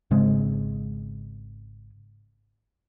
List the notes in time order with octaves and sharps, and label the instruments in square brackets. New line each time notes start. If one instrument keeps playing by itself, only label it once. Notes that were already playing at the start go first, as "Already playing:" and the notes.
[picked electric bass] G#1 C#3 G#3 C4